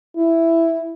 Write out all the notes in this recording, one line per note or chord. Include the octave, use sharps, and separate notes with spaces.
E4